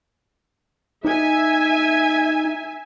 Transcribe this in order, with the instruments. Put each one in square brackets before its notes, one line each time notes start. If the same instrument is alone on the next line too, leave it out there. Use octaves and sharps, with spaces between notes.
[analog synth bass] D#4 [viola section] E5 G#5